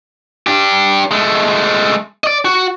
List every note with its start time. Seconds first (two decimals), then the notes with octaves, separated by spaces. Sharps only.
0.47 D4 G4
1.11 G#3 A3
2.24 D5 D#5
2.45 F#4